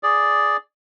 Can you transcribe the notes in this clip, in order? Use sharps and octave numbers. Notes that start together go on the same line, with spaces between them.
G#4 D5